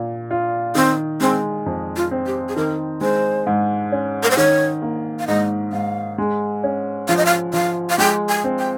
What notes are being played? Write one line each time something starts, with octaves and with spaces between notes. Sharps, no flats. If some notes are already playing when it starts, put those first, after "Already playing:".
Already playing: A#2
F4
D#3 C4
G#3 C4
F2
F4
C4
G4
G#4
D#3 A#4
G#3 C5
G#2
C#4
A#4
C5
D#3 C#5
A#3
F5
G#2 D#5
G#2 F5
G#3
C#4
F3 F5
D#5
F5
F3 F5
F5
G#3 G5
G#5
C4
G5